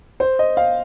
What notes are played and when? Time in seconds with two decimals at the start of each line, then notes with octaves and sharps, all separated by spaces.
0.20 C5
0.39 D#5
0.57 F5